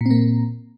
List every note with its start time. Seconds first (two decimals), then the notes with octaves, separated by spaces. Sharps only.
0.01 A#2
0.06 C4
0.11 A#3